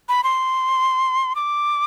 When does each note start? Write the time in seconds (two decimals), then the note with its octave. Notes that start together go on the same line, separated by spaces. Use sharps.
0.09 B5
0.24 C6
1.35 D6